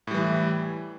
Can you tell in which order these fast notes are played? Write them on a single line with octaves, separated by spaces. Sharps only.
A2 G3 E3